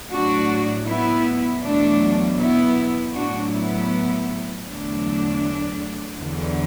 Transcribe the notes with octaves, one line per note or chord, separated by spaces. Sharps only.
A2 F#3 D4 F#4
B3 E4
E2 B2 F#3 A3 D4
B3 E4
A2 F#3 D4 F#4
B3 E4
E2 D3 F#3 A3 D4
E2 D3 F#3